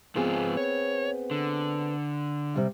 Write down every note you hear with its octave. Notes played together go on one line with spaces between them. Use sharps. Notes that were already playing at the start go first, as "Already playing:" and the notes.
G#2 F3 B3 C4 F4 G#4
C#5
D3
C3 G3 F5